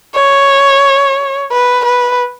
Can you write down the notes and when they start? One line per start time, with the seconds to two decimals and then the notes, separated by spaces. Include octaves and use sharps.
0.15 C#5
1.52 B4
1.85 B4